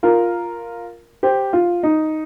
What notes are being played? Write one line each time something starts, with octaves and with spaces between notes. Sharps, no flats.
F4 A#4
G4 C5
F4
D#4